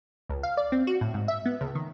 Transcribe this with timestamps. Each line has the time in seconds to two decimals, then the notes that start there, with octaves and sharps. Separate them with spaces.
0.30 C#2
0.43 F5
0.57 D5
0.72 C4
0.87 F#4
1.01 A2
1.14 G#2
1.28 E5
1.46 B3
1.61 C#2
1.75 D#3